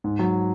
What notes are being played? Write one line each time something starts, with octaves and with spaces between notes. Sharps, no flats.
G#2
F#3